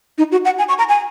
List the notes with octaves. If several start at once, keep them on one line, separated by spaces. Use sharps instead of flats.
D#4
F#4
F#5
G#5
C#6
A#5
G#5